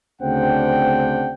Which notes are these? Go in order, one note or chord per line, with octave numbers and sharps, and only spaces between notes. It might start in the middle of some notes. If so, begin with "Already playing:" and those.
D2 C#3 C4 D4 F#5 G5